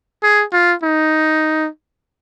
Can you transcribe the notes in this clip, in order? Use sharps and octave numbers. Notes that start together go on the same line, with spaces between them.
G#4
F4
D#4